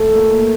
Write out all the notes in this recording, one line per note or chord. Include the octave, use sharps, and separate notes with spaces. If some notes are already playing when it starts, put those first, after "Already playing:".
Already playing: A3
A#2